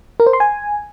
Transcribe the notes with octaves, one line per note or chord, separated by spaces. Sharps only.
A#4
C5
C6
G#5